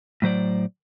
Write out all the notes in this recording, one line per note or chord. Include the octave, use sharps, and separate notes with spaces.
A2 F#3 C5 D5